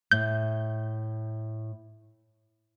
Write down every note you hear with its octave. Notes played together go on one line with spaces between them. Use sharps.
A2 G6